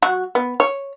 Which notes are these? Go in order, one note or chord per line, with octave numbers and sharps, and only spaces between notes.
F#3 F#4
B3
C#5